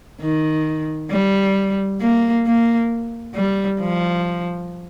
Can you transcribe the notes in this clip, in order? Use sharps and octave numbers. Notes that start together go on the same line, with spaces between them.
D#3
G3
A#3
A#3
G3
F3